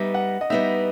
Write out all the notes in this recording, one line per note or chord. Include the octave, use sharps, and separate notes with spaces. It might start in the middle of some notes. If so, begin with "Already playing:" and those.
Already playing: G3 B3 D#4 E5
F#5
D#5
G3 B3 D#4 E5